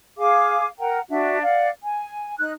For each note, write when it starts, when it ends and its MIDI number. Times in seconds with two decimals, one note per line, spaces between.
0.18 0.67 68
0.18 0.67 77
0.18 0.67 80
0.18 0.67 86
0.79 0.99 70
0.79 0.99 78
0.79 0.99 79
0.79 0.99 82
1.09 1.42 62
1.09 1.42 66
1.09 1.42 76
1.42 1.70 74
1.42 1.70 77
1.42 1.70 78
1.82 2.36 80
2.38 2.51 63
2.38 2.51 90